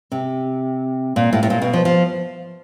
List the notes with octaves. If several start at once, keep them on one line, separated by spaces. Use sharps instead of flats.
C3
A#2
A2
A2
A#2
B2
F3
F3